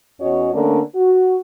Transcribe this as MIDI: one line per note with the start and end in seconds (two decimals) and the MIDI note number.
0.21 0.50 40
0.21 0.50 61
0.21 0.50 66
0.21 0.50 73
0.21 0.50 75
0.53 0.80 50
0.53 0.80 57
0.53 0.80 58
0.53 0.80 61
0.53 0.80 62
0.95 1.37 66